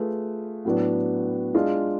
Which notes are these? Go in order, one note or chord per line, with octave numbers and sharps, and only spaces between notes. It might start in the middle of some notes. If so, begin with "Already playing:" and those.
Already playing: A3 F4 G#4 B4
A2 F#3 B3 D4
G#3 D4 F4 G#4